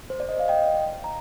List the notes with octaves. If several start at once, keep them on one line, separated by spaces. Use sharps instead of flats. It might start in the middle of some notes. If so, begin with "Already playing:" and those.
C5
D5
D#5
F5
D#5 G5
A#5